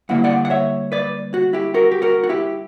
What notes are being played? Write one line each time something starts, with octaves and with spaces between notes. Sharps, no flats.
G2 D3 A#3 E4 F#5
D5 F#5
F#5
C#5 E5
B4 D5
F#4
E4 G4
F#4 A#4
G4
F#4 A#4
F#4
E4 G4